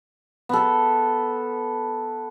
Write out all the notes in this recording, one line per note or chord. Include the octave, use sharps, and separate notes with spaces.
B3 A4